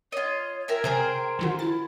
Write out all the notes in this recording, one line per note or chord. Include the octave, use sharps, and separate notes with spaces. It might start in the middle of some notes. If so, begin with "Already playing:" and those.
F4 C#5 D#5
A#4 E5 G5 G#5
C3 G#4 A#4 C5
D3 D#3 F4 F#4
E4 A6